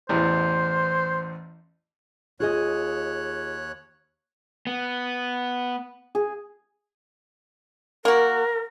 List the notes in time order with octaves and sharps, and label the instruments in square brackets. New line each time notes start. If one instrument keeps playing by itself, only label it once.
[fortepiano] A1 E2 [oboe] C5
[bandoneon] D#2 C#5 F#6 [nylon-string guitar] F4 G#4 D#5
[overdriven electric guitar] B3
[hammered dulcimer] G#4
[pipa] A#3 F#4 [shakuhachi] A#4